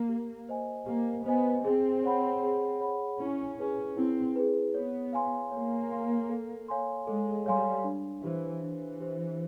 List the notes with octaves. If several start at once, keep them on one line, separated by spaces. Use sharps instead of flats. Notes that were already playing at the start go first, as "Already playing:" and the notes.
Already playing: A#3
G4
C5 D#5 G#5
A#3 G4
B3 C5 D#5 G#5
C4 G#4
C#5 F#5 B5
G#4
C#5 F#5 B5
C#4 E4
C#4 G#4 B4
C4 E4
G#4 B4
B3 C#5
F5 G#5 C6
A#3 C#5
F5 G#5 C6
A4
C#5 F5 G#5 C6
G#3 A4
G3 C#5 F5 G#5 C6
D4
E3 G4 C5
E3 D4
G4 C5